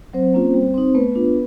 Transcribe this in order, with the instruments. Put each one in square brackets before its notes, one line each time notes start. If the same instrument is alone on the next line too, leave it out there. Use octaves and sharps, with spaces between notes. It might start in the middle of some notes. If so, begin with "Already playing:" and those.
[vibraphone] F#3 C4 C5
A#3 C#4 F4
G3
C4 D#4
A3 B3 B4
D4 F4